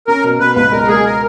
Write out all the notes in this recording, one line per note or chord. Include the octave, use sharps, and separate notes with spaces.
C#4 A#4
B2
B2 B4
C#2 B4
G#3 A#4
G#3 G#4
A#4